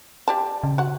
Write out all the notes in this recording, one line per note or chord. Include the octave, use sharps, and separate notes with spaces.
G4 D5 A5
C#3
F#4 F#5